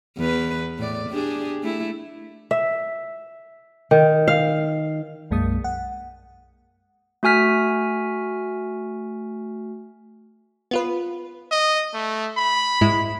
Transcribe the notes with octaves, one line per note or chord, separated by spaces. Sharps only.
E2 B4
A2 D5
D4 G4 G#4
A3 E4
E5
D#3
F5
B1 F#2 G#3 A#3 D#6
F#5
A3 F#4 G#5 F6 B6
B3 F4 B4
D#5
A3
B5
G#2 G#3 E4